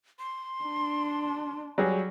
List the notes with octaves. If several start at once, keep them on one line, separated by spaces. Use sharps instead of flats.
C6
D4
F#3 G3 G#4